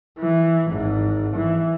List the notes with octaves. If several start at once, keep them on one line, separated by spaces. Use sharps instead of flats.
E3
G#1 G#2
E3